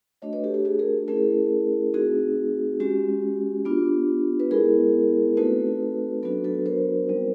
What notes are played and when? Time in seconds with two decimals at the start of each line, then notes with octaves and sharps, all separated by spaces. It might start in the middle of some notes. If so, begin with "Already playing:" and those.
0.22 A3 D4 F#4 C#5 D#5
0.33 B4 C#5
0.44 G4 A4
0.54 G4
0.65 F#4 G#4
0.79 G#4 A#4
1.08 A3 C#4 E4 G#4 A#4
1.94 A3 C4 D#4 F#4 G#4
2.80 G#3 C#4 F#4 G4
3.65 B3 D4 F4
4.40 B4
4.51 G#3 B3 E4 G#4 A#4
5.37 A3 C4 D#4 F#4 A4 B4
6.23 F#3 B3 D4 F#4 A4 B4
6.44 A4 B4
6.66 A#4 C5
7.08 G3 C4 D#4